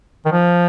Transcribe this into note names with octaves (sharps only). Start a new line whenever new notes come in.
D#3
F3